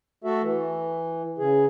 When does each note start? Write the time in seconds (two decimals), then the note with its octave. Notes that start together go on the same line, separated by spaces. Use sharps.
0.24 A3 F#4 A4 E5
0.42 E3
1.38 C#3 G#4